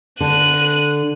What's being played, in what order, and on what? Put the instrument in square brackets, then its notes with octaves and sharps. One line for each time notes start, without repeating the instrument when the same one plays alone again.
[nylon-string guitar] D3 [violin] F#6 D#7